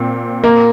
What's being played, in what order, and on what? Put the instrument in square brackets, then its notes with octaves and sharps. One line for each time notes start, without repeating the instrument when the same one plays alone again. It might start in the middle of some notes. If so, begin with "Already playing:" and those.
Already playing: [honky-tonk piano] A#2 C4
[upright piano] A#3